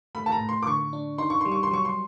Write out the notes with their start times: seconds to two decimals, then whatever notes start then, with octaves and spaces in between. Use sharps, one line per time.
0.15 A3 B5
0.26 A5
0.32 A#5
0.41 A2
0.49 C6
0.62 D6
0.67 D3 C#6
0.93 D4
1.18 D#4 C6
1.30 C#6
1.41 G3 C6
1.52 C#6
1.63 C6
1.71 F#3 C#6
1.85 C6